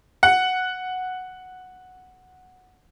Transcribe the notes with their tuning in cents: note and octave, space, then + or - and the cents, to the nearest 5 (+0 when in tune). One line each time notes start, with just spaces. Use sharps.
F#5 -5